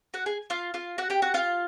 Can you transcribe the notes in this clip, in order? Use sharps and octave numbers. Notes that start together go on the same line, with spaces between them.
F#4 F#5
G#4 G#5
F4 F5
F4 F5
F#4 F#5
G4 G5
F#4 F#5
F4 F5